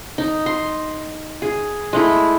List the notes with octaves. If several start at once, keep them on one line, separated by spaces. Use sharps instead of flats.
D#4
C6
G#4
G#3 A3 E4